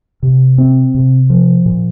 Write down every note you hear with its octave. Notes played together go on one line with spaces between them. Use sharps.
C3
C4
C3
F3
A#2